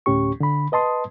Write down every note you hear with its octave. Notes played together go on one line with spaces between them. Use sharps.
D2 A2 C#4 G4 C#6
D3 B5
B4 D#5 A5 C6 D#6